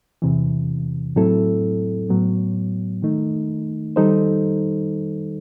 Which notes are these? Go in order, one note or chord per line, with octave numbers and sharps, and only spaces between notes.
E2 C3 E3
A2 F#3 C4 E4 A4
A2 F#3 B3
D#3 A3 D#4
D#3 G3 D#4 A4 C5